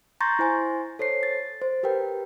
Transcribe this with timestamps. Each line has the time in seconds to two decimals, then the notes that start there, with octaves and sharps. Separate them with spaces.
0.20 A#5 C6 C#6 G6 A6 A#6
0.39 E4 C5 G#5 C6
0.99 A4 C5 C#5 C7
1.23 A6
1.62 C5
1.83 G4 A#4 B4 G5